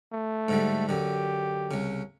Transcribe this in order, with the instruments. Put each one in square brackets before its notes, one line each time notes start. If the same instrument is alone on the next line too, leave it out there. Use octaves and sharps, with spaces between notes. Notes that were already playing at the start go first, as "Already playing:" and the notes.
[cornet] A3
[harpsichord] G#2 D3 G3
[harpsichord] F#2 D3 [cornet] G4
[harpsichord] C2 C#3